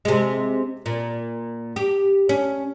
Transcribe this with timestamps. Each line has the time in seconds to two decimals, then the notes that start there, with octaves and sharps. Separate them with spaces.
0.05 C3 G#3
0.86 A#2
1.76 G4
2.29 C#4